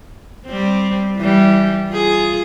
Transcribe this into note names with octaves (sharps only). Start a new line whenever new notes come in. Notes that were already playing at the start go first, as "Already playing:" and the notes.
G3 C4
E3 G3
F4 G#4